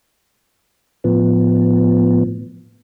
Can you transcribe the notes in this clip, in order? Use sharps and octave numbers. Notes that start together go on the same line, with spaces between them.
A2 F3 B3